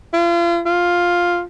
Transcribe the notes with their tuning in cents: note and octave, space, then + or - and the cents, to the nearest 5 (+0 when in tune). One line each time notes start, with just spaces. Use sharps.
F4 -35
F4 +5